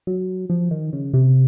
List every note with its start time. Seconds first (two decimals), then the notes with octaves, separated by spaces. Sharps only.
0.07 F#3
0.50 F3
0.71 D#3
0.93 C#3
1.13 C3